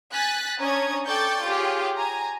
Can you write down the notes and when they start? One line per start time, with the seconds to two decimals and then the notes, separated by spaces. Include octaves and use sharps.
0.12 G#5 F#6 A6 B6
0.60 C#4 D4 C#5 A#5 D#6 G#6
1.06 A4 D5 G5 C#6 G6 A6
1.45 F4 G4 G#4 C#5
1.98 G#5 A#5